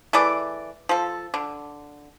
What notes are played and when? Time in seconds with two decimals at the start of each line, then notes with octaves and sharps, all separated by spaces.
0.13 E3 A3 G#4 D5
0.89 F3 A4
1.34 D3